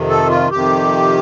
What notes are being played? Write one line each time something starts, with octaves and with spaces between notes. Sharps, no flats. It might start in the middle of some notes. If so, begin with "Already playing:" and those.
Already playing: F2 C3 D#3
A4
F4
F2 C3 D#3 G4